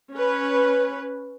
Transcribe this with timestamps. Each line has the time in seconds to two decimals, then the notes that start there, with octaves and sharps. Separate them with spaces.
0.14 C#4 B4